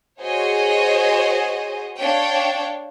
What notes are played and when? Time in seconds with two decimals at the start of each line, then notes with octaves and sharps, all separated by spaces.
0.20 F#4 G#4 C5 C#5 D#5
1.99 D4 C#5 F5 G5